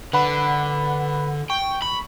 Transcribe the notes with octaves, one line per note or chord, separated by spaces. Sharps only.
D3 B4 F#5 B5
G5 C#6
B5